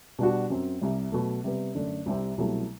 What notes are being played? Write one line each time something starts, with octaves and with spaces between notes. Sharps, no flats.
B2 G3 D4 F#4
F#2 F#3 C4
C2 C3 G3
B2 F#3 A3
C3 G3 B3
F#2 D3 A3 D4
C2 C3 G3 C4
C2 B2 F#3 A3 E4